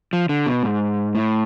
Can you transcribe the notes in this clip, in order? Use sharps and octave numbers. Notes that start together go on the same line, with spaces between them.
F3
D3
B2
G#2
A2